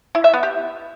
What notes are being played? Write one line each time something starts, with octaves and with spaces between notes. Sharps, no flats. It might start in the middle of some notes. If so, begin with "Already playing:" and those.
E4
E5
B3
G4